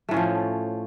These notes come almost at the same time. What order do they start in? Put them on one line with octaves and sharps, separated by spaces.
A3 A2 C#4 F3